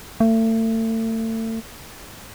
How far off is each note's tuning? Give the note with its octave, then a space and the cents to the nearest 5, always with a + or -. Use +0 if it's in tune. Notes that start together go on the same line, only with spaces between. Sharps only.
A3 +35